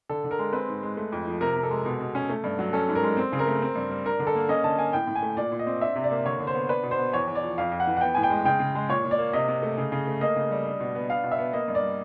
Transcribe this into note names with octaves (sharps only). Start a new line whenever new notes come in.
D3 A4
D3
A#4
G#3
C4 B4
G#2
G#3
A3
F2
F3
C3 A#4
C3
A4
G#3
B2
B2
C#4
A3
G2
F#3
C#4 A4
G#2
A#4
G#3
C4
C#3
A#4
A3
C4
G2
G3
D4 A#4
D3
A4
A#3
C#4 D#5
D3 A5
A#3 G#5
A2 G5
A2
G#5
A3
A#2 D5
A#2
D#5
C4
D4 E5
C3
D5
A#3
D3 C#5
D3
C5
B3
D4 B4
B2
C5
B3
E2 C#5
E2
D5
F3
F2 F5
F2
F#5
E3
F#5
B3 G5
A2 G#5
G5
G#3
C#3 G5
C#3
G#3
A#2 C#5
A#2
D5
A#3
C3 D#5
C3
A3
C#3
C#3
A3
A#3 D#5
C#3
G3
D4
B2
B3
D4 F5
B2
E5
B3
A#3 D#5
G2
D5
G3